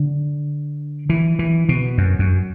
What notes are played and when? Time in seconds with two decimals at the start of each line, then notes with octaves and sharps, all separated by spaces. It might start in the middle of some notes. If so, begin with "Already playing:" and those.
Already playing: D3
1.09 E3
1.39 E3
1.69 B2
1.98 F#2
2.19 F#2